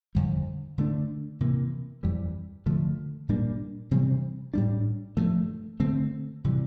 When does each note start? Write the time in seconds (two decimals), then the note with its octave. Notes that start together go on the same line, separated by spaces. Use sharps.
0.15 F2 D3 G3
0.78 D3 A3 D4
1.40 C3 E3 A#3
2.03 F2 E3 G3
2.66 D3 F3 A3
3.29 A#2 G3 A#3 D4
3.91 C3 E3 G3 C4
4.54 A2 G3 D4
5.17 G2 F3 A3
5.80 D3 A3 C4
6.44 C3 E3 G3